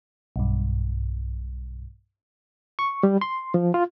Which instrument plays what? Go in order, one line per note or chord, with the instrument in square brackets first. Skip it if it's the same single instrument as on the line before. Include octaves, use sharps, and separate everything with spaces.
[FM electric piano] B1 G2
[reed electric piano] C#6
G3
C6
F3
F4